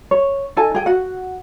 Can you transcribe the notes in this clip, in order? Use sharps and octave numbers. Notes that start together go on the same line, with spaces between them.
C#5
D#4 A4 G#5 A5
G#4 G5
F#4 F#5